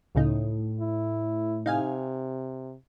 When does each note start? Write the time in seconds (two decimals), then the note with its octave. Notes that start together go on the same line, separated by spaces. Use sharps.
0.15 C#2 A2 C#3 D#4
0.80 E4
1.66 C3 D#4 F5 G#5